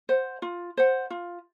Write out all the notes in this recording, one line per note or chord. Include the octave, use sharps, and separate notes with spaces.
C5 F#5
F4
C5 F#5
F4